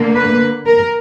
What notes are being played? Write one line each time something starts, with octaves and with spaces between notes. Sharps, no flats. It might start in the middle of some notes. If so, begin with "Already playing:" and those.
Already playing: D3 A#3
B4
A#4